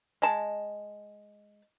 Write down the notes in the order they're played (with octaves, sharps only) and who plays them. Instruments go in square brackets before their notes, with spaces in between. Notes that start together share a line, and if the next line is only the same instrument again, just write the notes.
[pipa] G#3 A5